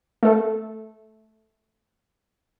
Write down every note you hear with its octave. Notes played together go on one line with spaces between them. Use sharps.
A3 A4